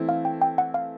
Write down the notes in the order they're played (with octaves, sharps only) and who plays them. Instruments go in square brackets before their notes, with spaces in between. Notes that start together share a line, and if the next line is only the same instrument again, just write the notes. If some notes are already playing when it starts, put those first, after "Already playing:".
Already playing: [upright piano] E3 A3 C4 E4
[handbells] F5
G5
G5
F#5
F5